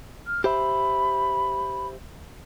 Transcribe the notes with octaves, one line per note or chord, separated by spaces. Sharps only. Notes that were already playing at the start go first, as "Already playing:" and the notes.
F6
G4 C5 E5 B5